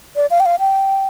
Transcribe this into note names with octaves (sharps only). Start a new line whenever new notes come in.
D5
F5
G5
F5
G5